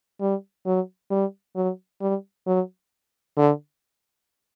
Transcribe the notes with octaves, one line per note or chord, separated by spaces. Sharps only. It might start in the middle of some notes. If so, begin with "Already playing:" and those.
G3
F#3
G3
F#3
G3
F#3
D3